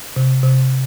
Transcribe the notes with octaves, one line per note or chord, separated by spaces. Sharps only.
C3
C3